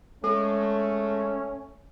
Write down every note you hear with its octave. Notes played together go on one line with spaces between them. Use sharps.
G#3 A3 C#4 A4